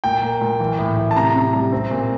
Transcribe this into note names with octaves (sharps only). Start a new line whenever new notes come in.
A#2 G5
A#3
A#2
E3
A2
A2
A5
C3 A#5
C3
G3
C4
A#2